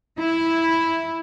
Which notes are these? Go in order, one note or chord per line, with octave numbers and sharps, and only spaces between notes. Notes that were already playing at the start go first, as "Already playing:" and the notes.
E4